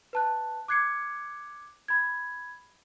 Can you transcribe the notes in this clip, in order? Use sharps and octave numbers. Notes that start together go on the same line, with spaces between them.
B4 A5 F#6
D6 F#6 G#6 C7 C#7
B5 G#6